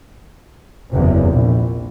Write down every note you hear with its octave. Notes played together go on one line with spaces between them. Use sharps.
F#1 E2 C3
A#1